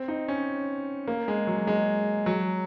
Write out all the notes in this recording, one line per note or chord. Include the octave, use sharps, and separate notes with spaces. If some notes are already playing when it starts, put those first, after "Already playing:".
Already playing: C4
D#4
C#4
A#3
G#3
F#3
G#3
F#3